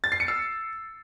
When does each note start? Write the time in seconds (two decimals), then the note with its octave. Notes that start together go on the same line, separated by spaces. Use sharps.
0.04 A6
0.12 C7
0.20 C#7
0.28 E6